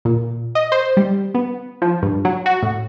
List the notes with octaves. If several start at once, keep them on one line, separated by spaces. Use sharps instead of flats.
A#2
D#5
C5
G3
B3
F3
G2
F#3
F#4
A2